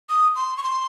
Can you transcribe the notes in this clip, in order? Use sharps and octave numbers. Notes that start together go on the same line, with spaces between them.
D#6
C6
C#6
C6